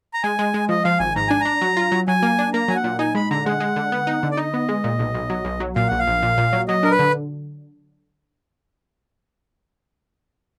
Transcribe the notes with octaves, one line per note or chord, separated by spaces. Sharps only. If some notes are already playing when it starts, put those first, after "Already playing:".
A#5
G#3 G#5
G#3
G#3
F3 D#5
F3 F5
G#1 G#5
G#2 A#5
D4 G#5
D4 A#5
F#3
F4
F#3
F#3 G#5
A#3
D4
A#3 A#5
F#3 G#5
F#5
A#2
D#4 G#5
G#3 B5
D3 A#5
G#3 F#5
G#3
D3
B3
D#4
D3
D5
D#4 D#5
B3
G#3
A#2
B1
B1
F#3
B1
F#3
A#2 F5
A#1 F#5
F5
A#1
A#2
A#2
F#3
F#3 D#5
D4 A#4
B4
D3